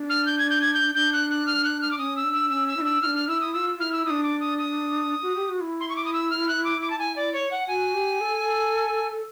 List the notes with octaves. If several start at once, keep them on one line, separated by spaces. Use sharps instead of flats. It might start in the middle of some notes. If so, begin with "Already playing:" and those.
Already playing: D4
F6
G6
G#6
G6
G#6
G6
D4 G6
F#6
F#6
F6
F#6
F6
D6
C#4 D#6
E6
D4
E6
C#4 E6
E6
E4
D4 E6
D4 E4 F6
F6
E4 E6
D#6
F4 E6
E4 F6
E6
D4 E4 D#6
D6
D#6
D#6
F#4
G4
F#4
E4
C6
C#6
D6
D#6
E6
F6
F#6
D6
D6
A5
G#5
D5
C#5
F#5
F#4 G#5
G4
A4